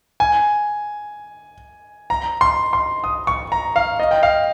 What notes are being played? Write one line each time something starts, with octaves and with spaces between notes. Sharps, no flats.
G#5
A#5
C6
C6
D#6
C#6
A#5
F5
D#5
G5
F5